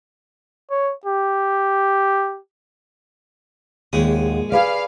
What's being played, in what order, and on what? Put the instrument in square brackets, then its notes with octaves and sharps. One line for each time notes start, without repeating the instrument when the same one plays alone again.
[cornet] C#5
G4
[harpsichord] A#1 G#3 D#6 [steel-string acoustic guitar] D#2 F#5
[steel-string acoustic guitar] G#4 B4 D5 [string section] F5